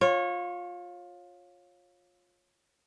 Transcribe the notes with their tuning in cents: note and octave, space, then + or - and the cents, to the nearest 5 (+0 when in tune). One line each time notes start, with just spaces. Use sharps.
F4 +20 C#5 -20